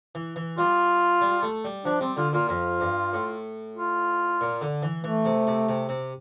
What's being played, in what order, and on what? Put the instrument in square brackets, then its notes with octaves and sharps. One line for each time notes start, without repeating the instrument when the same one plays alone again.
[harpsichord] E3
E3
[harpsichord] G3 [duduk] F4
[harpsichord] G3
A3
G3
[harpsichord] F3 [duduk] D4
[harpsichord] G3 [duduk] C4
[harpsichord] D3 [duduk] F4
[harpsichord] A#2 [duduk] F4
[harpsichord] F2 [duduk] F4
[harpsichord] G2
A2
[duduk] F4
[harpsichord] A#2
D3
E3
[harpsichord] E3 [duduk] A3
[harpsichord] C3
C3
C3
C3